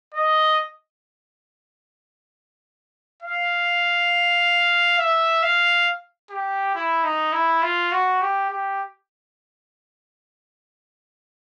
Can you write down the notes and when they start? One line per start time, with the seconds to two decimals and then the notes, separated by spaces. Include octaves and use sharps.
0.14 D#5
3.23 F5
4.99 E5
5.43 F5
6.31 G4
6.75 E4
7.04 D#4
7.33 E4
7.62 F4
7.92 F#4
8.22 G4
8.50 G4